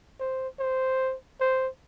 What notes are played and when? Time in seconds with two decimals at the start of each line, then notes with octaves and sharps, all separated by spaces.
0.20 C5
0.59 C5
1.40 C5